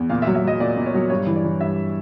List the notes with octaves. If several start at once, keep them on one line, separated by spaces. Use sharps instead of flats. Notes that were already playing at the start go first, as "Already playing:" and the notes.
Already playing: E2
A#2 F5
E5
F#3
E5
F#3 D#5
A#2 D5
A#2
C#5
F#3
G2 C#5
E3
D5
E3
G2 E5